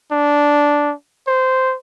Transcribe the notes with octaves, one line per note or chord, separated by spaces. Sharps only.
D4
C5